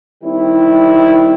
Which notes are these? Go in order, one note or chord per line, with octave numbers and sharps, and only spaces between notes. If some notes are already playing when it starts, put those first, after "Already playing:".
D#3 G3 C4 E4